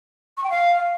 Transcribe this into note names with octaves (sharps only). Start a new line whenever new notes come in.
C#6
G5
F5